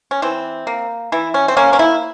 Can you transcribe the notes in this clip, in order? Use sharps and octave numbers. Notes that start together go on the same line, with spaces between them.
C#4
E3 C4
A#3
E3 E4
C#4
C4
A#3 C#4
C#4
E4